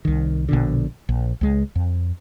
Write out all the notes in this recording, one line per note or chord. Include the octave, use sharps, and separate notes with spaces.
C2 D#3
A#1 B2 D3
A#1
C#2 G#3
F2